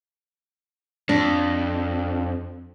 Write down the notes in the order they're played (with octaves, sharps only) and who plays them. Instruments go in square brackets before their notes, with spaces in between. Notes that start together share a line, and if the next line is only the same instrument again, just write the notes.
[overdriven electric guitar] F2 [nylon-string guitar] D4